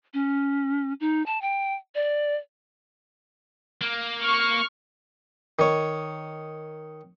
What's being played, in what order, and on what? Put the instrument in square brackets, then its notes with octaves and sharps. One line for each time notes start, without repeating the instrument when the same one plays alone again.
[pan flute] C#4
D#4
A5
G5
D5
[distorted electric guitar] A#3
[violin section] C#6 F6
[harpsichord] D#3 C#5